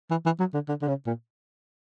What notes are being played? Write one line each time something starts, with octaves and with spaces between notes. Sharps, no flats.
E3
E3
F#3
D3
D3
D3
C#3
A#2